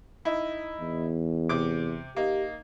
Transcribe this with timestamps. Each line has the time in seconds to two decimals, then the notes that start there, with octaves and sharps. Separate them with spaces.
0.25 D#4 E4
0.80 E2
1.49 C3 D6
2.16 A#3 D#4 G4